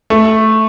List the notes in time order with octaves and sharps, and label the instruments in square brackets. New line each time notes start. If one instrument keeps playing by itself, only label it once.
[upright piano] A3